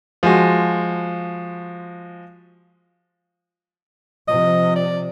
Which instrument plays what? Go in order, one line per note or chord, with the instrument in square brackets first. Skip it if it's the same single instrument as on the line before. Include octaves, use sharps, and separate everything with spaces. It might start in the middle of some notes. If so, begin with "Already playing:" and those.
[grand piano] F3 G#3 F#4
[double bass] C3 F3 [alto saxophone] D#5
[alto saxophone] D5